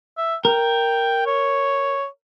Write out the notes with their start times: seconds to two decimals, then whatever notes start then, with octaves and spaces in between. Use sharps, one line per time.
0.17 E5
0.45 A#4 G5
1.26 C#5